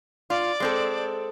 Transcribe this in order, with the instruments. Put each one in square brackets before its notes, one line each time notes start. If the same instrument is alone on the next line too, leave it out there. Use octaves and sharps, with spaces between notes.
[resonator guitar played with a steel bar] F4 [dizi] D5
[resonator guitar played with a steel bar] G#3 C4 A4